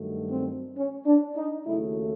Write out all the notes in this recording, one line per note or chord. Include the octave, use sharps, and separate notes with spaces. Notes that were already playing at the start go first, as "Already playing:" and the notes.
Already playing: G2 D#3 F#3 A3
C4
C#4
D4
D#4
D#2 C#3 F#3 A3 E4